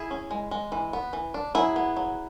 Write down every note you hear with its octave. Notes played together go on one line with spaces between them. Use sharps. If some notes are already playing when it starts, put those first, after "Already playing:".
Already playing: E4 G#4
C#4
G#3
G#3
E3
B3
E3
D4
F#3 E4 G#4
B3
F#3